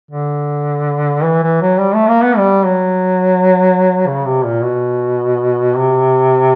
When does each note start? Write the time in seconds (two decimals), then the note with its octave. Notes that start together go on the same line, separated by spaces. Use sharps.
0.11 D3
1.24 E3
1.43 E3
1.61 F#3
1.80 G3
1.95 A3
2.08 A#3
2.23 B3
2.38 G3
2.66 F#3
4.07 C#3
4.26 C3
4.45 A#2
4.63 B2
5.76 C3